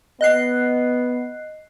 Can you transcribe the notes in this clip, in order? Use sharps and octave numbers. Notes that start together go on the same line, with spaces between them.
B3 D#5 F#6 C7